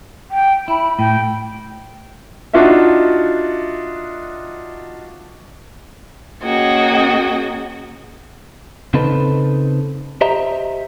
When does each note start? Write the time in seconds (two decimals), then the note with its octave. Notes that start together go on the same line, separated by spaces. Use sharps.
0.31 G5
0.68 E4 B5
0.99 A2 G5
2.54 D4 D#4 F4 F#4 D#5 E5
6.43 A#3 C#4 F#4 G#4 D#5 G5
8.94 C#3 C4 D#4 A4 B4
10.21 G4 C5 D#5 E5 A#5